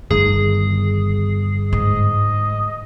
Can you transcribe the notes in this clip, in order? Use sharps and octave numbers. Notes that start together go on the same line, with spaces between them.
G1 D#3 G#4
G#2 D#5